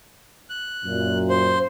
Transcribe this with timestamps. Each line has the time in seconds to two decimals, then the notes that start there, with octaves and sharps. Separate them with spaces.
0.50 F#6
0.85 F#2 A#2
1.30 C5